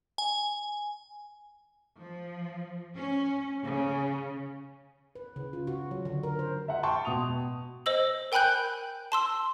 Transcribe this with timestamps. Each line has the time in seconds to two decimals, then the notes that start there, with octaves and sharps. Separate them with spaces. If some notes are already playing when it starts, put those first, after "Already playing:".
0.18 G#5
1.99 F3
2.95 C#4
3.64 C#3
5.15 B4
5.36 C#3
5.53 F4
5.67 F#4
5.91 F#3
6.05 D3
6.23 A#4
6.39 C5
6.68 E5 F#5
6.83 G5 A5 C6 C#6
7.05 B2 D#6 F7
7.86 C5 D#5 E6 F#7
8.32 A#4 G5 G#5 B5 F#6 G6
9.12 A5 C6 E6